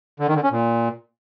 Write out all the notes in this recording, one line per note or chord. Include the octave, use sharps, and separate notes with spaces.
D3
D#3
D3
C#4
A#2